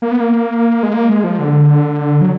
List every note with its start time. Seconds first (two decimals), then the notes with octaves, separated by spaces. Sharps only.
0.02 A#3
0.11 B3
0.20 A#3
0.83 G#3
0.94 A#3
1.09 G#3
1.24 F3
1.39 D3
2.21 F#3